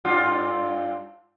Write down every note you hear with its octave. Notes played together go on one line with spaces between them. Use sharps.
G2 D4 F4